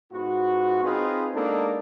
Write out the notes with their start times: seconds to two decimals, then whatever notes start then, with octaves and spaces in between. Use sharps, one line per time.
0.12 G#2 B3 F4 F#4
0.83 C4 D#4 F4 G#4 B4 C5
1.34 G#3 A#3 B3 D4 D#4 A4